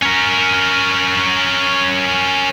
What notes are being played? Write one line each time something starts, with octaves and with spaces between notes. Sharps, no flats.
C#4 A#4